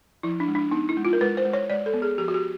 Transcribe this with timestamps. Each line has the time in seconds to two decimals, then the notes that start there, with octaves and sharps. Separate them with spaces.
0.23 F3 E4
0.40 D4
0.48 G#3
0.55 D4
0.71 B3 D#4
0.89 E4
0.97 G#3
1.05 F4
1.13 A#4
1.21 G#3 B4
1.37 C5
1.45 G#3
1.53 C#5
1.70 G#3 D5
1.86 A4
1.94 B3
2.02 G#4
2.18 F3 G4
2.28 F#4
2.34 G4